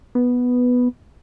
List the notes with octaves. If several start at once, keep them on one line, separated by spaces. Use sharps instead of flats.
B3